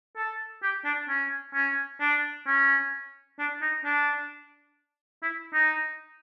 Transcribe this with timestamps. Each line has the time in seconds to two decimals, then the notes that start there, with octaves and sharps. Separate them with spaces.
0.16 A4
0.63 G4
0.85 D4
1.09 C#4
1.54 C#4
2.00 D4
2.47 C#4
3.39 D4
3.62 D#4
3.84 D4
5.23 E4
5.54 D#4